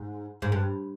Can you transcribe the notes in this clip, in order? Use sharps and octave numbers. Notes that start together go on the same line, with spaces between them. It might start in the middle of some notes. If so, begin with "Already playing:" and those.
Already playing: G#2
G#2
G2